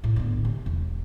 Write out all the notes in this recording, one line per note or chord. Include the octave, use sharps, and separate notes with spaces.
A2 C#3
D3 B3
C3
E1